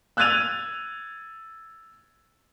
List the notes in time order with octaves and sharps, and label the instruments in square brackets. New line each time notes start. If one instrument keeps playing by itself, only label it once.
[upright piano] E6 F#6 G#6 A6 D#7 F7